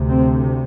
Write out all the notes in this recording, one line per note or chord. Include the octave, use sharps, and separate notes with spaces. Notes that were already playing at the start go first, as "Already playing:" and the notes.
Already playing: D2 C3
C4